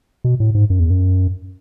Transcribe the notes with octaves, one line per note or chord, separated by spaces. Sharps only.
B2
A2
G#2
F#2
E2
F#2